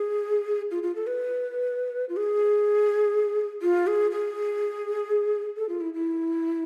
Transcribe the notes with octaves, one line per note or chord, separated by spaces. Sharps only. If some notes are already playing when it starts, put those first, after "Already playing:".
Already playing: G#4
F4
F4
A4
B4
F4
G#4
F4
G#4
G#4
A4
F4
E4
E4